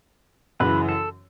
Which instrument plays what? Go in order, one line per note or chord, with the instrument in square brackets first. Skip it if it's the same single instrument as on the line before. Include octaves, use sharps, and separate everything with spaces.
[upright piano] F#2 C#3 E3 [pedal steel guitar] B4
[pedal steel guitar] A4